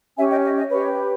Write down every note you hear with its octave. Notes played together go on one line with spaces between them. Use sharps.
C#4 G4 C#5 E5 G#5
D#5 G5
D#5
D#5
G4 B4 C#5